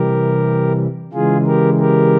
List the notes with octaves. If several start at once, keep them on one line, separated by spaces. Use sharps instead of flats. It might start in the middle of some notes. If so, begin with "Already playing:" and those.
Already playing: C3 E3 G3 G4 A#4
C#3 E3 G#3 F4 G#4
G4 A#4
G4 A#4